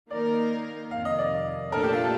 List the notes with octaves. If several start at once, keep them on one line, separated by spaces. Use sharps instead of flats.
D#3 A#3 D#4 A#4 D5
F2 C3 D#3 F5
D#5
D5
A#2 A3 D4 A4 A#4
G4
F4